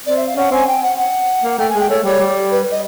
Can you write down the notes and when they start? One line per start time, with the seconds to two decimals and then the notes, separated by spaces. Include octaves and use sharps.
0.06 C4 D5
0.16 E5
0.27 F5
0.36 C#4 F#5
0.51 C4 G#5
0.67 G5
0.82 F#5
0.98 F#5
1.43 A#3
1.58 A3 G5
1.69 G#5
1.74 G#3 G5
1.89 A3 C#5
2.04 G3 C#5
2.19 G3
2.51 B4
2.71 D#5